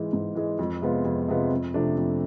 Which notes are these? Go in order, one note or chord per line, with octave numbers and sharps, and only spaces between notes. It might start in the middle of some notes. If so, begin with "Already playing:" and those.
Already playing: G#2 E3 G#3
G#2
E3 G#3
F2
C3 G#3 B3 F4
F2
C3 G#3 B3 F4
F2
C3 F3 A3 D4
F2